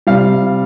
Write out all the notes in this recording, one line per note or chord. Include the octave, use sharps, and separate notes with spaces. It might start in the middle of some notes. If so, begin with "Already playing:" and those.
C3 G3 F5